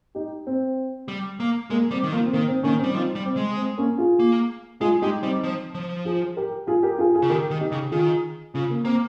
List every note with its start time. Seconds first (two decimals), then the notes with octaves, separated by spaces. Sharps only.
0.15 D#4 G4
0.47 C4
1.08 G3
1.40 A#3
1.70 G#3 A#3
1.91 G3 C4
2.03 D#3
2.12 F3 A#3
2.26 C4
2.33 D#3 A#3
2.48 C4
2.63 D#3 A#3 C#4
2.79 C4
2.83 G3
2.94 F3 C4 D#4
3.15 G3
3.26 C4
3.37 G#3
3.57 C4
3.78 A#3 C#4
3.98 F4 G#4
4.20 A#3
4.81 G#3 F4 G#4
5.02 G#3 D#4 G4
5.22 G3 C4 D#4
5.44 F3
5.75 F3
6.05 F4 G#4
6.37 G4 A#4
6.67 F4 G#4
6.83 G4 A#4
6.98 F4 G#4
7.14 F4 G#4
7.22 C#3
7.30 D#3 G4 A#4
7.51 D#3
7.61 D#4 G4
7.72 C#3
7.91 D#3 F4 G#4
8.54 C#3 C#4 F4
8.70 A#3
8.85 A#3 C4